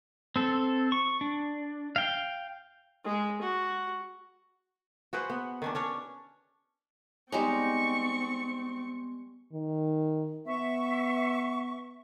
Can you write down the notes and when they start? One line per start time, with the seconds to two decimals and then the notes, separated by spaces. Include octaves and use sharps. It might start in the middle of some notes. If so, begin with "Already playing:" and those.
0.36 C4 A4
0.92 C#6
1.21 D4
1.96 F5 G5
3.04 G#3
3.41 F#4
5.13 F#4 G#4 B4 C5
5.30 B3
5.62 D#3 C#4 D4
5.75 C#4 D4 C#5
7.32 G3 G#3 B3 C4 D#4 C6 C#6
9.53 D#3
10.47 B3 E5 C#6